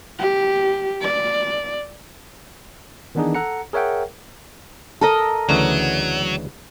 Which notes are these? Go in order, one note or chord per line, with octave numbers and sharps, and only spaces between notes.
G4
D5
D#3 E3 B3 D4 D#4 G#4
A4 F#5 A#5 C#7
G#4 A#4 C#5 E5 F#5 G5
A4 A#4 D#5
D2 C#3 E3 F#3